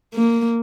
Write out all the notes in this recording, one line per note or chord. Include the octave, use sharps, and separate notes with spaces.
A#3